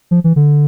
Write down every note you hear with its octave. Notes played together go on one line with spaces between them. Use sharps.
F3
E3
D3